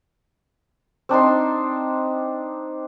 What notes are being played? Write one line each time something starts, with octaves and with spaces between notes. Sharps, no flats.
C4 D4 D#4 C6